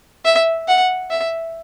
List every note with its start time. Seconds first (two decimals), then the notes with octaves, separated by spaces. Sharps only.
0.25 E5
0.68 F#5
1.10 E5